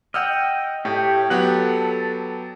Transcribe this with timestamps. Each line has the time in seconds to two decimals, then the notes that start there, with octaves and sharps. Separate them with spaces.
0.14 D#5 F#5 G5 E6 F6
0.85 A2 G4 C#5
1.30 F#3 B3 G4 F#5
1.42 A4